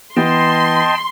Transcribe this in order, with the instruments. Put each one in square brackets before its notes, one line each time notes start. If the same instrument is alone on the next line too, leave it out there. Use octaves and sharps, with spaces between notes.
[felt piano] E3 B3 [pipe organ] D#5 G5 A5 [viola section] C6